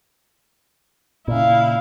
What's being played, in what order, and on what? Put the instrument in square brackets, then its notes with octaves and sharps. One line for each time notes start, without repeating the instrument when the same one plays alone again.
[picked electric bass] A#2 C#3 [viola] E4 F5